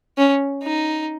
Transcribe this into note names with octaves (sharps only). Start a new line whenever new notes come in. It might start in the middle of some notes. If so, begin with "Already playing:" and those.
C#4
D#4